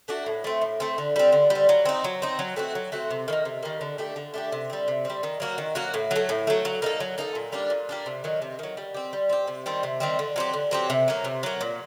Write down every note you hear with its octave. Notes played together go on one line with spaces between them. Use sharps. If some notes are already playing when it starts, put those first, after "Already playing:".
A3 D4 F#4
A2
A3 C4
A2
A3 C4
D3
G3 C4
D3
G3
C4
F#3
C4 D#4
F#3
C4 D#4
F#3
A3 C4 F#4
F#3
A3 C4 F#4
C3
D#3 G3 A#3
C3
D#3 G3 A#3
D3
A3 D4 G4
D3
A3 D4 G4
C3
G3 C4
C3
G3 C4
D#3
F#3 A#3 F#4
D#3
F#3 A#3 F#4
A2
F#3 A3
A2
F#3 A3
F#3
A#3 D#4 A4
F#3
A#3 D#4 A4
A#2
G3 A#3 D4
A#2
G3 A#3 D4
C3
D#3 F#3
C3
D#3 F#3
G3
C4 G4
G3
C4 G4
C3
D#3 G3 C4
C3
D#3 G3 C4
D3
F#3 C4 G4
D3
F#3 C4 G4
C3
F#3 A#3
C3
F#3 A#3
A#2